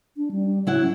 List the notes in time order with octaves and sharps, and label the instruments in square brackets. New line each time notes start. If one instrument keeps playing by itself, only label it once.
[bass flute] D4
G3
[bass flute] C#3 [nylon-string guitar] F#3 E4 F#5
[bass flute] C#4